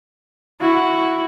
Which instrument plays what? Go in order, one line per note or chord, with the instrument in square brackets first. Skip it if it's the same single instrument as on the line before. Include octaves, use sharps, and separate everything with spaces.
[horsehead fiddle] E4 F#4